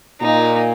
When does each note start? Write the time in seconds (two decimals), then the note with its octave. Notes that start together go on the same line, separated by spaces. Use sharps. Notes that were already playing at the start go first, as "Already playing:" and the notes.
0.21 A#2 D#4